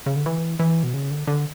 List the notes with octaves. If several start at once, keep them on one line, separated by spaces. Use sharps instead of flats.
C#3
D3
E3
E3
B2
C#3
D3
D3